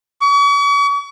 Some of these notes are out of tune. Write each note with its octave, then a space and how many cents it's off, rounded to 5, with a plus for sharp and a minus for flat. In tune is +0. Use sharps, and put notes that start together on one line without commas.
C#6 +45